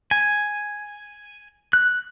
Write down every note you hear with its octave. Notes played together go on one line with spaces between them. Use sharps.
G#5
F#6